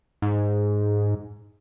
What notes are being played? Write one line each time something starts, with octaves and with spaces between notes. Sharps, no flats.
G#2